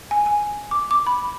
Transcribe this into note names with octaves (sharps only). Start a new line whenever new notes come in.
G#5
G#5
D6
D6
B5